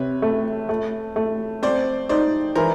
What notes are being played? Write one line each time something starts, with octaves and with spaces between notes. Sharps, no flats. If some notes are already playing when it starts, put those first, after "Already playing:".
Already playing: C3 B4 C#5
A3
A3
A3
C4 C5 D5
D#4 C5 D5
E3 A#4 C5